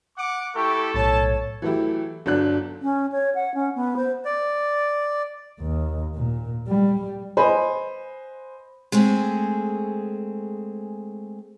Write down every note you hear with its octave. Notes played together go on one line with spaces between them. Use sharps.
F#5 D6
A3 E4 G4 A4 C#6
B1 A2 C#5 A5
E3 F#3 A3 E4 G4
G1 F#3 D4 F#6
C#4
C#5
F#5
C#4
B3
C5
D5
D#2
A#2
G3
B4 C5 D#5 G#5 B5 C6
G#3 A3 C4 G#4